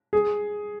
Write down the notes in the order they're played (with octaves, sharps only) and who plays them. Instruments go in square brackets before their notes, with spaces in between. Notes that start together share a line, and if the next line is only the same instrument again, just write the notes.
[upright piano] G#4